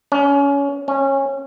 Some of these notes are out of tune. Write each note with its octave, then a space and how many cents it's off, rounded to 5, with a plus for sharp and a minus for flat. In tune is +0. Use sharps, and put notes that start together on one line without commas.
C#4 +25
C#4 -20